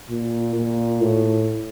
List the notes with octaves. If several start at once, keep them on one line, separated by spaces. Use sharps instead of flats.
A#2
A#2
A2